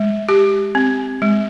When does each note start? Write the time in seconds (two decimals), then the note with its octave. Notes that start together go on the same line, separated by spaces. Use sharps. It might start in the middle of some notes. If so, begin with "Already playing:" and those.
Already playing: G#3
0.29 G4
0.75 C4
1.22 G#3